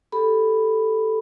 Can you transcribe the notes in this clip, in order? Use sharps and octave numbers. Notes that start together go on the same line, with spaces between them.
G4 A4 B5